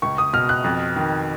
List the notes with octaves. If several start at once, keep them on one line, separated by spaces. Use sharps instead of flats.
C#2 C#6
D#6
B2 F6
F#6
F2
D#3